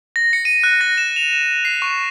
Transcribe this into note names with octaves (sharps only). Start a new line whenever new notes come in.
A#6
C#7
D#7
F#6
A#6
E7
F7
E7
C7
C#6